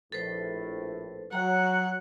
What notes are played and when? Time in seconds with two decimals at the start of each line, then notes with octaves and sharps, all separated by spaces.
0.12 A#1 A2 A4 B4 C5
1.33 F#3 F#5 A#5